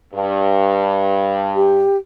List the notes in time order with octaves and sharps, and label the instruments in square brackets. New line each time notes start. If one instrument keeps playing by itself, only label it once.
[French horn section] G2
[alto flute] G4